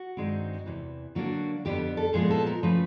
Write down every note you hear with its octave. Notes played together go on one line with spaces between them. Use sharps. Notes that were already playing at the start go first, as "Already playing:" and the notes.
Already playing: F#4
G2 D#3 G#3 C4 D#4
E2 C3 E3
D3 F#3 A#3 D4 F#4
F2 D3 G3 B3 G4
A4
A#2 F3 G#3 B3 G#4
A4
A#4
C#3 F3 A3 B4